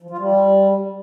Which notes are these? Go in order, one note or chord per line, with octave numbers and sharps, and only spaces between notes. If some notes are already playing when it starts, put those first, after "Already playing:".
F3
F4
G3